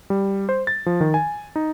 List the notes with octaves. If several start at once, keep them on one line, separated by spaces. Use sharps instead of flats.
G3
C5
A6
F3
D#3
G#5
D#4